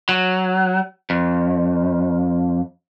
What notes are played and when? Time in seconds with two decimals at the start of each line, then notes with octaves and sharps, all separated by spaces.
0.09 F#3
1.10 F2